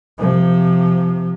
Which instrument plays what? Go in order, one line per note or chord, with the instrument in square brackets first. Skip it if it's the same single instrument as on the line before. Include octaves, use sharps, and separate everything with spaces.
[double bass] C3 F3